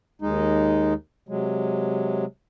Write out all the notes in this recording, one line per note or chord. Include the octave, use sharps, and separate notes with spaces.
D#2 G#3 D#4
C3 F#3 G#3